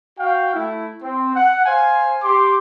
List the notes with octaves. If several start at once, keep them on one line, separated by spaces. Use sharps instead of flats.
F#4 F5 G5
A3 E4
C4
F#5
C5 F5 G#5
G4 C6 D6